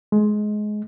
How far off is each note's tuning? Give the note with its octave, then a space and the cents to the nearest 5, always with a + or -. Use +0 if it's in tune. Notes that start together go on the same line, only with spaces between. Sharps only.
G#3 +20